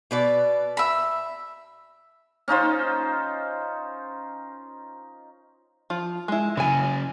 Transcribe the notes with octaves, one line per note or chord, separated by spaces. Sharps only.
B2 B4 D5
E5 B5
C#4 D#4 F4 C5
F3 F4
G#3 E4
C#3 F#3 E4 G#5